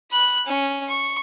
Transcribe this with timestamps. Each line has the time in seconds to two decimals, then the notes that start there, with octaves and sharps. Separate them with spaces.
0.11 B5 F#6
0.46 C#4
0.88 C#6